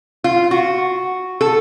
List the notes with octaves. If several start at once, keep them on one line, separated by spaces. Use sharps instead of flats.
F4
F#4
A4